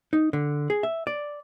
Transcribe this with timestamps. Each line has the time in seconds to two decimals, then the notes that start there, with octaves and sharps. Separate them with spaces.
0.13 D#4
0.33 D3
0.70 G#4
0.83 E5
1.07 D5